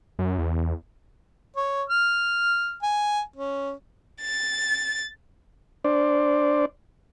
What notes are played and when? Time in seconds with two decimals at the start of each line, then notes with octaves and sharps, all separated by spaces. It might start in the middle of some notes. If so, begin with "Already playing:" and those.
0.19 F#2
0.38 E2
1.57 C#5
1.90 F6
2.83 G#5
3.36 C#4
4.21 A6
5.84 D4 C5 D5